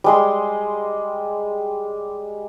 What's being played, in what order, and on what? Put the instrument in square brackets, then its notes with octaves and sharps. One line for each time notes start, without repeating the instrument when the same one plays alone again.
[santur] G3 G#3 C6